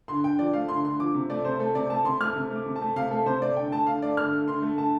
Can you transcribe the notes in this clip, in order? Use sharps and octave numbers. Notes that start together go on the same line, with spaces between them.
D3 C6
D3 G5
F3 D5
A3 F5
D3 C6
D3 C6
F3 D6
C3
A3 D5
C3 C5
A3 A4
C3 D5
A3 A5
C3 C6
A3 F6
C3
A3 D6
C3
A5
A3
C3 F5
A3 A4
C3 C5
A3 D5
D3 G5
A3 A5
D3 F5
A3 D5
D3 F6
A3
D3 C6
A3
D3 A5